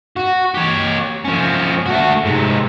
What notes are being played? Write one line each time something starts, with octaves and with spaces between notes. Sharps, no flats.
F#4
G4 C#5
F3 C#4
A3 F#4
G#2 C3